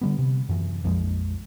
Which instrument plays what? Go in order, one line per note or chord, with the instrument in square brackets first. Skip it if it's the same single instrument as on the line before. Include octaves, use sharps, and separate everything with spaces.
[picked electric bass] D3 G3 B3
C3
F#2 E3
A#1 F2 F3 G#3